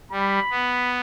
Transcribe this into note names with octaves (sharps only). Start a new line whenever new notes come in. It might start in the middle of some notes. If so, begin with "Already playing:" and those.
G3 B5
B3